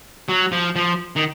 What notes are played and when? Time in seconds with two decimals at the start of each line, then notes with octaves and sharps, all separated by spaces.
0.29 F#3
0.52 F3
0.76 F3
1.16 D#3